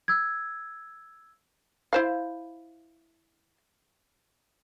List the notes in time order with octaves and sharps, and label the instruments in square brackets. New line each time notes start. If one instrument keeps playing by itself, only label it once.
[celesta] E6 G#6
[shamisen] E4 C5 F5